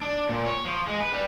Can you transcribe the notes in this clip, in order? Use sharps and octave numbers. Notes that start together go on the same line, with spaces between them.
D4
A#2
C#5
F3
G#3
B4
G3